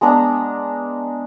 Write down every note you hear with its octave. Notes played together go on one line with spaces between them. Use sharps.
G#3 B3 D4 A#5